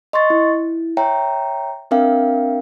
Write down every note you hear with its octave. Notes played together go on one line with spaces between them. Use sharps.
D#5 C6 C#6 A6
E4
C#5 E5 G5 A#5
C4 D4 A#4 E5 F5 G5